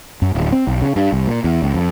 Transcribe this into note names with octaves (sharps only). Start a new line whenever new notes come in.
F#2
D1
C4
B1
C#3
G2
C2
A#2
E2
C#2
F2